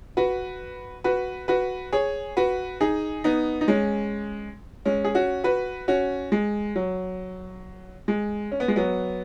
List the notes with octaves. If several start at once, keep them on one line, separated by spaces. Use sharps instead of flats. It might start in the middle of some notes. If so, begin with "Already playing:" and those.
F#4 B4
F#4 B4
F#4 B4
G#4 C#5
F#4 B4
D#4 G#4
B3 D#4
D#4
G#3 C#4
G#3 C#4
G#4
C#4 F#4
F#4 B4
C#4 F#4
G#3
F#3
G#3
C#4
B3
G#3
F#3 B3